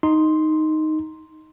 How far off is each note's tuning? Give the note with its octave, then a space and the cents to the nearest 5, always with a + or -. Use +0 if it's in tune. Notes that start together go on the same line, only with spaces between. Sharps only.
D#4 +0 C6 +0